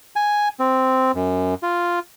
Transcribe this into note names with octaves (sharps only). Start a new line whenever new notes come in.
G#5
C4
F#2
F4